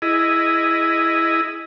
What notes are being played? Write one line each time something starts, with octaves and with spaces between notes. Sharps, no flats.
E4 G#4 D#5